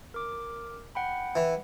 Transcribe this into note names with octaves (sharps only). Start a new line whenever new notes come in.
A#4 D6
F#5 G5 B5
E3